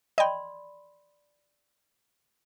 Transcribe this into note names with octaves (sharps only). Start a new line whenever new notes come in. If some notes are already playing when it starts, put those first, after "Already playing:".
D5 D#5 G5 B5 C6